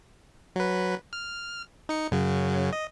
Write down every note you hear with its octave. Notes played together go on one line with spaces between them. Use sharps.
F#3 B4
F6
D#4 C#7
F#2 C#3 F#3
D#5